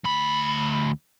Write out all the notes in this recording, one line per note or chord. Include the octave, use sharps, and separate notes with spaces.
D2 B5